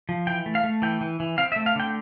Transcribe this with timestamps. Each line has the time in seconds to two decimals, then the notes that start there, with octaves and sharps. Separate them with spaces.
0.09 F3
0.27 E3 G5
0.46 A3
0.55 F5
0.64 A3
0.82 E3 G5
1.01 E3
1.20 E3
1.38 C4 F5
1.52 E5
1.56 A3
1.66 F5
1.76 D3 G5